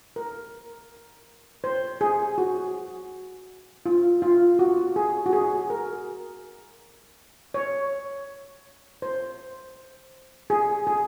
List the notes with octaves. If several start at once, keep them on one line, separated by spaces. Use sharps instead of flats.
A#4
C5
G#4
F#4
F4
F4
F#4
G#4
F#4
G#4
A#4
C#5
C5
G#4
G#4